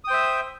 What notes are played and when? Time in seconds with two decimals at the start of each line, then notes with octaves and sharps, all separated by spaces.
0.04 D#6
0.07 G5
0.10 C5
0.13 E5